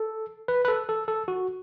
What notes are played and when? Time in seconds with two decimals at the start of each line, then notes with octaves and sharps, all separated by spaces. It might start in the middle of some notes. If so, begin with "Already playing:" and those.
Already playing: A4
0.48 B4
0.65 B4
0.68 A4
0.89 A4
1.08 A4
1.28 F#4